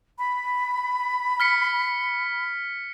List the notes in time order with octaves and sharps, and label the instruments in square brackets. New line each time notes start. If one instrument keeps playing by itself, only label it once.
[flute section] B5
[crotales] F6 B6 C#7